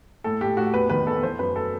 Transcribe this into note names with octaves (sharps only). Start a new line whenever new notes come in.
A2 A4
A2 G4
A2 F#4
E2 B4
D#3 B4
E2 A4
E3 C5
F#2 B4
A4